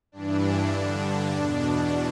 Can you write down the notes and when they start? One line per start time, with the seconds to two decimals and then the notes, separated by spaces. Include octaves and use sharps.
0.12 G2 E3 D4
0.73 G2 D3
1.32 E2 B2 D4